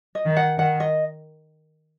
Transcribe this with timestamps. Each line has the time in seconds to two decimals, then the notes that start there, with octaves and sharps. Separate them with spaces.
0.15 D#5
0.26 D#3
0.37 F#5
0.58 D#3 F#5
0.80 D#5